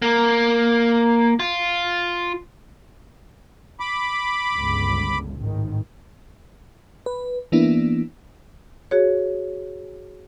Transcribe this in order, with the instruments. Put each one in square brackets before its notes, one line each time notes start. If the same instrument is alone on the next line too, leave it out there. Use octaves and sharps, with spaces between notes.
[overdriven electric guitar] A#3
F4
[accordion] B5 D6
[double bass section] G1 C#2 G2
G#1 A2 D#3
[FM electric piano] B4
E3 A#3 B3 D4 E4
[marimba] F#4 G#4 C#5